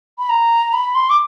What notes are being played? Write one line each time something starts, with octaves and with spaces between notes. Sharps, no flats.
B5
A#5
B5
C6
D6